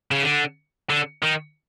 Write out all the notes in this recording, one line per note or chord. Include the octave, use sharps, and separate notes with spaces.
C#3
D3
D3
D#3